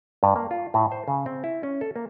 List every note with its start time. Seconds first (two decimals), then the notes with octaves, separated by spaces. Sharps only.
0.23 G2
0.36 A#3
0.51 F4
0.74 A2
0.92 C5
1.08 C#3
1.26 C4
1.44 E4
1.63 C#4
1.81 A4
1.96 A#3